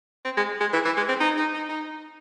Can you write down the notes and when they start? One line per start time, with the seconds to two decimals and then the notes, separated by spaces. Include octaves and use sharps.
0.25 C4
0.37 G#3
0.60 G#3
0.73 E3
0.85 E3
0.97 G#3
1.08 C4
1.20 D#4
1.37 D#4
1.53 D#4
1.69 D#4